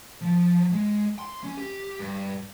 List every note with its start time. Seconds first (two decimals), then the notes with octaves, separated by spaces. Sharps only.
0.22 F3
0.72 G#3
1.19 C6
1.44 C#4
1.57 G4
1.99 G2